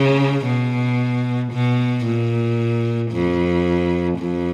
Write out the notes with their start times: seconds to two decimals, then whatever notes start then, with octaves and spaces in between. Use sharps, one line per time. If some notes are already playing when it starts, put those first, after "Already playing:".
Already playing: C#3
0.46 B2
1.52 B2
2.05 A#2
3.12 F2
4.18 F2